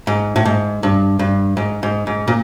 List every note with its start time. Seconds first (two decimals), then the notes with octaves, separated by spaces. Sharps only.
0.07 G#2
0.36 A2
0.45 G#2
0.83 G2
1.19 G2
1.57 G#2
1.83 G#2
2.07 G#2
2.28 A#2